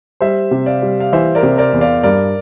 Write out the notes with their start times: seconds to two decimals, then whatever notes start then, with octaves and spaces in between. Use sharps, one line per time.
0.21 G3 C5 E5
0.51 C3
0.66 D5 F5
0.82 G3
1.00 F5
1.13 E3 C5 E5
1.35 A#4 D5
1.43 C3
1.58 A#4 D5
1.73 E2
1.81 D5 F5
2.03 G2 A#4 D5